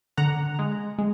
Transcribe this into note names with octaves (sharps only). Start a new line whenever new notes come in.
D3 F#5 A#5
G#3
G#3